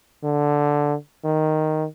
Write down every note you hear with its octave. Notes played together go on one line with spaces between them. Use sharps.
D3
D#3